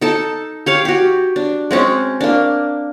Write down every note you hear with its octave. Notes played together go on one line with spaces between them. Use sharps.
D#4 A4 A5
G4 C#5 F5
F#4 G4
D4
G#3 C4 C#4
A#3 D4